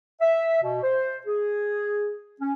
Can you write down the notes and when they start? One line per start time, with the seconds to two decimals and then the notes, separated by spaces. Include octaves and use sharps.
0.20 E5
0.62 B2
0.82 C5
1.26 G#4
2.41 C#4